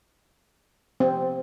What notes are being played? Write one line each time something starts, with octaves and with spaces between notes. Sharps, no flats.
C4